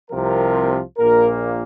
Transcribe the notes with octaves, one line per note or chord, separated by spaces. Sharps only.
C2 C3 F3 A#4
A#1 A#2 A#3 A#4